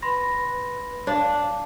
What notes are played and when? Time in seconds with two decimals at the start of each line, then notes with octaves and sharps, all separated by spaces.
0.02 B4 B5 C6 A#6
1.07 D4 F5